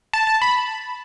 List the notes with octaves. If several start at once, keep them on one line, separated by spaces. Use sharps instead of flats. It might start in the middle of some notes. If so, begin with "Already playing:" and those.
A5
A5
B5